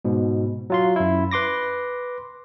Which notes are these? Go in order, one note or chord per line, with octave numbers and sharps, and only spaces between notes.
G#2 B2
F#3 F4 C6
F#2 E4
B4 C6 D6 A#6